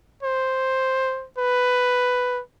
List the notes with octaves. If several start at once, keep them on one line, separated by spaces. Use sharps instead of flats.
C5
B4